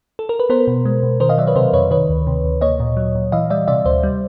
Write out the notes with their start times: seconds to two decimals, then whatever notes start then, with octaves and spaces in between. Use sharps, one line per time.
0.19 A4
0.29 A#4
0.39 B4
0.50 B3 A#4 C5
0.67 B2
0.85 G#3
1.03 B2
1.20 D#3 A#4 C5
1.29 D#5 F5
1.38 F#3 D5 E5
1.47 B4 C#5
1.55 C3 A#4 C5
1.73 F2 B4 C#5
1.91 D#3 B4 C#5
2.09 D2
2.27 C3
2.44 D2
2.61 A#3 C#5 D#5
2.80 A#2
2.97 F#3
3.15 A#2
3.32 E3 D#5 F5
3.50 G3 D5 E5
3.68 C3 D5 E5
3.85 D2 C5 D5
4.03 G3